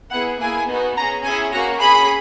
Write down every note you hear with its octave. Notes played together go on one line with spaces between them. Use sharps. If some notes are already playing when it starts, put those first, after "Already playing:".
B3 E4 G#4 F#5
A#3 E4 G#4 G#5
B3 D#4 F#4
C#4 G#4 A#5
C#4 E4 G#4 G#5
A#3 C#4 F#4 A#5
C#4 G#4 B5